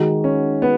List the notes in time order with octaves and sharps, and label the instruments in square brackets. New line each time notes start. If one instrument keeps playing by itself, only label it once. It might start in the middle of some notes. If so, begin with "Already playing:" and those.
Already playing: [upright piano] D#3 G#3 D#4 F#4
[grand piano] C#4
B3